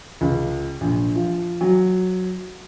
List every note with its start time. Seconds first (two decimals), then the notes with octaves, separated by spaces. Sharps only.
0.21 C#2
0.81 A#1
1.16 F3
1.61 F#3